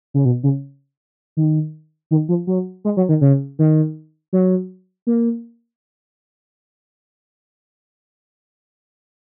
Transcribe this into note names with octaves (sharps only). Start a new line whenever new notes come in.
C#3
B2
C#3
D#3
D#3
F3
F#3
G#3
F#3
D#3
C#3
D#3
F#3
A#3